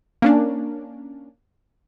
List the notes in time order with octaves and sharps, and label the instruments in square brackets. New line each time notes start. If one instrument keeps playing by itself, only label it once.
[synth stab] A#3 C#4 D4